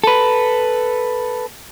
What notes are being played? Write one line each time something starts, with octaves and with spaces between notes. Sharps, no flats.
A4 B4